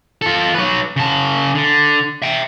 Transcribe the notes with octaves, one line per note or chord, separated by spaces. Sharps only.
F4 A4
F#3 B4
C#3 A5
D3
E5 G5